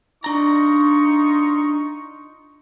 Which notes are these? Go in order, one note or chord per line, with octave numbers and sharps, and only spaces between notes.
D4 D#4 F4 A#5 C#6